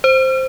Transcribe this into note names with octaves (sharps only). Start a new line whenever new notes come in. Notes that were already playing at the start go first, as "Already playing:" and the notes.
C5